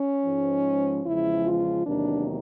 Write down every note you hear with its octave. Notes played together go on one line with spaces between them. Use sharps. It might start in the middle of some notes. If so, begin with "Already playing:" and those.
Already playing: C#4
G#2 F3 G#3
E2 C#3 F3 G#3 E4
F4
E2 C3 D#3 F#3 A#3 D4